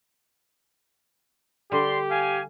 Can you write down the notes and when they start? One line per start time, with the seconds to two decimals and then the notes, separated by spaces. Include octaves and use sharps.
1.72 D3 G3 G4 D5 C6
2.10 F5 G#5